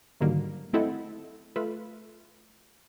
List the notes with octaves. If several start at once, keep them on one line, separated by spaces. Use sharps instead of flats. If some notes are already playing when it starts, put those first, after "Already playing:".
G#2 D3 D#3 F#3 G3 A#3
A3 C4 E4 A4 D#5 F#5
A3 F4 A4 B4